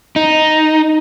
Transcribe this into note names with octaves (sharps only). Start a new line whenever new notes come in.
D#4